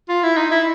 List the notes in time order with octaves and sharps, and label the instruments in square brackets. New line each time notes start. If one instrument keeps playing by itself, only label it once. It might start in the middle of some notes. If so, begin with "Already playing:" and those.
[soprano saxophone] F4
E4
D#4
E4